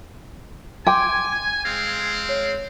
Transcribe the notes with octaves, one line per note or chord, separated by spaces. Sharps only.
G5 G#5 C6 D6 G#6
G#6
G#3 C4 F5
C#5